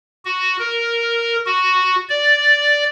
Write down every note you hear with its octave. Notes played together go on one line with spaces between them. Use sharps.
F#4
A#4
F#4
D5